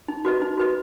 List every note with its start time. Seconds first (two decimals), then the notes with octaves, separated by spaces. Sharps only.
0.08 D#4
0.25 F#4 B4 D#5
0.41 D#4
0.57 F#4 B4 D#5